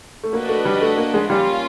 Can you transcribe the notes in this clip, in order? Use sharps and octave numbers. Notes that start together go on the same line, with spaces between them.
A3
A#3 D4 F#4 B4 D#5
A3
G3
A3
A#3
G#3
G3 A#3 C#4 F4